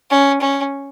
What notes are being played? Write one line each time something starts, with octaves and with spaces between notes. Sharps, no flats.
C#4
C#4